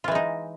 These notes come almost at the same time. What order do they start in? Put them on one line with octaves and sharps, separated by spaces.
F4 E3 G#3 D#4